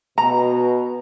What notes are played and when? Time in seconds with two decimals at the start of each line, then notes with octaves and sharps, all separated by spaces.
0.18 B2 A#5